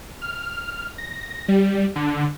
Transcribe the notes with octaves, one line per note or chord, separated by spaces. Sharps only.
F6
A#6
G3
D3